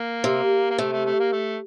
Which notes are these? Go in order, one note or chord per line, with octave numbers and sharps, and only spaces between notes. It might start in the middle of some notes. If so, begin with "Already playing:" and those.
Already playing: A#3
C3
A#3
C3 A3
A3
A3
A#3
A3